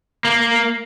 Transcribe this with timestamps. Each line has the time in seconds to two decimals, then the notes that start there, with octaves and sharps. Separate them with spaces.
0.25 A#3